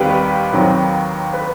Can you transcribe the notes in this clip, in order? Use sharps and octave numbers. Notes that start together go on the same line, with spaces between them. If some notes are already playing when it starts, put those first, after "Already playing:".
Already playing: D#2 D#3 G3 C4 G4 B4
D#2 D#3 F#3 C4
B4